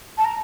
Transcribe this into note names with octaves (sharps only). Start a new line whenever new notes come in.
A5
A#5